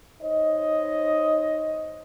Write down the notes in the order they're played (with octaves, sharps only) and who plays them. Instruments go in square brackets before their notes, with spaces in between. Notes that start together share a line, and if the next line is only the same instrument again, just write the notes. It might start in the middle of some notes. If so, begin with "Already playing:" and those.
[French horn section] D#4 C5 C#5 D#5